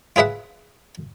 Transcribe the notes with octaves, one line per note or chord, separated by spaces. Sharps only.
F4 G#4 B4 E5 F#5